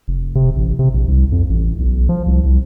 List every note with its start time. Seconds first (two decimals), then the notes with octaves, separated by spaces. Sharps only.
0.08 F1
0.35 C3
0.56 A1
0.79 C3
0.94 A#1
1.08 C2
1.32 F2
1.49 A1
1.78 B1
2.09 F3
2.26 C2
2.44 C2